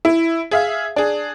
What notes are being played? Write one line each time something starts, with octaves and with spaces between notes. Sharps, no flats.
E4
G#4 E5 F5
D4 G#4